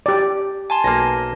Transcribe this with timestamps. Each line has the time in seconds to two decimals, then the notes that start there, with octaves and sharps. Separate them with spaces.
0.06 G4 D5
0.70 G#5 A5 C6
0.84 B1 A#3 A#6